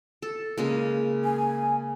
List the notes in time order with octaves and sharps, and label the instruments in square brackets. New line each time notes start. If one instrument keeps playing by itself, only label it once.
[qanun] A4
C#3 G#3 A#3
[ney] G#5